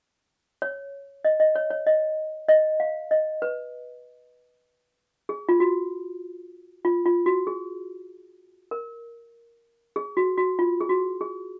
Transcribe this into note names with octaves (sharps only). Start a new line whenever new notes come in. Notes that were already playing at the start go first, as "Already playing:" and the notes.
C#5
D#5
D#5
C#5
C#5
D#5
D#5
F5
D#5
B4
G#4
F4
F#4
F4
F4
F#4
G#4
A#4
G#4
F#4
F#4
F4
G#4
F#4
G#4